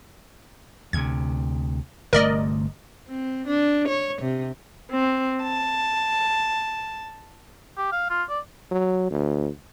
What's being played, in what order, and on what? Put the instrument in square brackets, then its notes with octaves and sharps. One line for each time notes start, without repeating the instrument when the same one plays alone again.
[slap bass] D2 C3 [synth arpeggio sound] G#6
[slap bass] G1 C3 A3 [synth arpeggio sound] A#4 D5 D#5
[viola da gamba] C4
D4
C#5
C3
[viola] C4
A5
[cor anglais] G4
F5
F4
D5
[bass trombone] F#3
D2